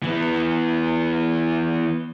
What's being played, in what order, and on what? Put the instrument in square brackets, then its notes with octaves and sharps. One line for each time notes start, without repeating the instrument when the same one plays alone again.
[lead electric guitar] E3 B3